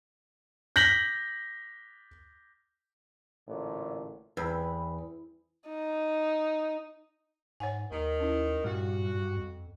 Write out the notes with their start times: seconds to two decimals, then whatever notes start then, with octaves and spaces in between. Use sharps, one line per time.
0.76 G6 A#6 B6 F#7
3.47 A1 A#2 D3
4.37 E2 C4 B4
5.68 D#4
7.60 G#2 C#5 F#5 G#5
7.91 D#2 D#3
8.20 C#4 E4
8.64 G2 A#2 F#4
9.37 F2